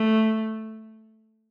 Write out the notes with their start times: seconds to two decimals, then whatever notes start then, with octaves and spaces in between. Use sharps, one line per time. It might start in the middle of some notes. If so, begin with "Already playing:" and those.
Already playing: A3